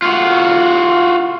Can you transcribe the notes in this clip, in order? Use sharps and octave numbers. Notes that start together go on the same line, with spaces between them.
F4 F#4